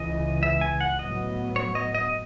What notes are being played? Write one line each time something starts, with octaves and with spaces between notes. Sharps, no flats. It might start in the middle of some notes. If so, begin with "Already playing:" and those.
Already playing: C#2 C#3 E3 D#5
E5
G#5
F#5
A2 F#3 B3 D#5
C#5
D#5
D#5